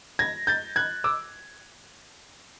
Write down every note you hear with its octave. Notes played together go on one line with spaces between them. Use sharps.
G#6 A#6
G6 A6
F#6 G#6
D6 E6